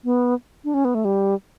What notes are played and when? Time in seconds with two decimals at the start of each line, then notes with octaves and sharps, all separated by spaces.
0.04 B3
0.64 D4
0.74 C#4
0.85 B3
0.95 A3
1.05 G3